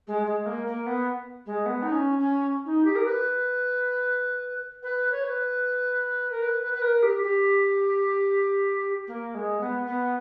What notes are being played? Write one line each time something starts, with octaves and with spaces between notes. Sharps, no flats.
G#3
G#3
A#3
A#3
B3
G#3
B3
D#4
C#4
C#4
D#4
G4
A#4
B4
B4
C#5
B4
A#4
B4
B4
B4
A#4
G4
G4
A#3
G#3
B3
B3